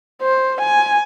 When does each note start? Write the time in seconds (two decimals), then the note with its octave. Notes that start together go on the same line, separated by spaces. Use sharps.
0.22 C5
0.61 G#5